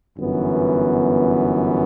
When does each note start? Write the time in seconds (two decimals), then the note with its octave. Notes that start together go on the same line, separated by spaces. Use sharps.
0.18 G1 F#2 E3 B3